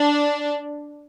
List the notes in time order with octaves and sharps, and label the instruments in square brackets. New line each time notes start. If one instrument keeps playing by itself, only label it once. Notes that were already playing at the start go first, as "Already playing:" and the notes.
Already playing: [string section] D4